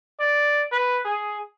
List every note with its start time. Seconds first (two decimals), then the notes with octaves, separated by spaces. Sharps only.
0.20 D5
0.72 B4
1.05 G#4